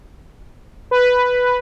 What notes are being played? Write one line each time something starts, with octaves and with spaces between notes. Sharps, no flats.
B4